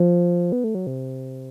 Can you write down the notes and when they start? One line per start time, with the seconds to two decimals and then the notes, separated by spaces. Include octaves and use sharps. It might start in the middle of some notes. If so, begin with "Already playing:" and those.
Already playing: F3
0.52 B3
0.64 A3
0.75 F#3
0.87 C3